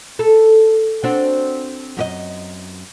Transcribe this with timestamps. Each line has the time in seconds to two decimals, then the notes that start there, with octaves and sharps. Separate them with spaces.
0.19 A4
1.04 C4 D4 F#4
1.97 F#2 G4 D#5